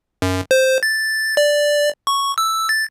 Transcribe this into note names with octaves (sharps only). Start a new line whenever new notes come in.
F#2
C5
A6
D5
C#6
E6
A6